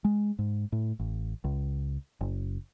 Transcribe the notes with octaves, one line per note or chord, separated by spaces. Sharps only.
G#3
G#2
A2
A1
C#2
F#1